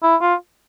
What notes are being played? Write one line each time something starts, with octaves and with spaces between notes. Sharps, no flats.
E4
F4